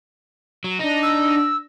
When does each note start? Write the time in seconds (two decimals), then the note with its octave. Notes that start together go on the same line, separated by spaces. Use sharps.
0.64 F#3
0.79 D4 D#4 A#6
1.03 E6